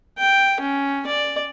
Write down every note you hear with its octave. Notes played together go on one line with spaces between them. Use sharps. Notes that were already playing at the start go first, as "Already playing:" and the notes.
G5
C#4
D5